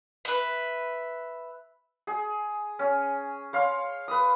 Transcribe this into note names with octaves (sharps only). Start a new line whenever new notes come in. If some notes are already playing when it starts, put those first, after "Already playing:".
B4 E5
G#4
C#4
C#5 F5 C6
B4 D#6